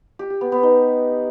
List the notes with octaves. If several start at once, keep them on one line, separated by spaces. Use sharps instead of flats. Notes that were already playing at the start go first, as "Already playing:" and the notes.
G4
G4
B3
B3
D#4